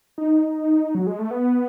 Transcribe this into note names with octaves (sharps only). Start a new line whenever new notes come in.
D#4
F#3
G#3
A3
B3